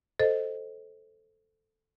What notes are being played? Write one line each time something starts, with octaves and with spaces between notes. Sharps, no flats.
A4 C5 D#5